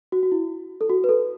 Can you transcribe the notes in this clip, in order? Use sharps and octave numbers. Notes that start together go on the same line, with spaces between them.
F#4
F#4
E4
A4
F#4
B4
A4